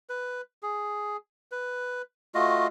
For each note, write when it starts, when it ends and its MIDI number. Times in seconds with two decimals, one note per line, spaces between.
0.09 0.41 71
0.63 1.17 68
1.52 2.02 71
2.35 2.67 57
2.35 2.67 65
2.35 2.67 66
2.35 2.67 75